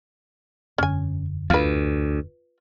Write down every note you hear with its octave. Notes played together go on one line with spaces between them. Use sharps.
E1 F#2 D3 C#4 G#5
D2 F4 B4